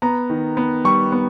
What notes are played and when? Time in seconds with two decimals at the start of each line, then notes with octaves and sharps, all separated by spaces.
0.02 B3 A#5
0.30 D#3
0.57 B3
0.85 G3 C#6
1.12 B3